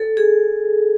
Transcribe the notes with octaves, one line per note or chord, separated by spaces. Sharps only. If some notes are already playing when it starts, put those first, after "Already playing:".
Already playing: A4
G#4